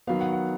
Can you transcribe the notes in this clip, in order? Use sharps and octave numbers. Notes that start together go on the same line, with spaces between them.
D#3 F#3 B3 F5
F#5
F#5